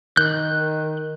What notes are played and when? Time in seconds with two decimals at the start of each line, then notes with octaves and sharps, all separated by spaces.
0.17 D#3 F#6 G6